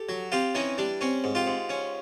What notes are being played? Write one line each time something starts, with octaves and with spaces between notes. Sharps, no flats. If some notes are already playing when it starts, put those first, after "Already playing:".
Already playing: G4 A4
F#3
C4 F4 G4
E3 C#4 D#4
G3 D4
C4 C#4
G#2
F4 G4
G#2
C#4